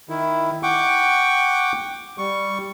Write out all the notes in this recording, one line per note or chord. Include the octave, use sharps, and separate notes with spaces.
D#3 E4
F#5 G5 C#6 D6
G3 C#6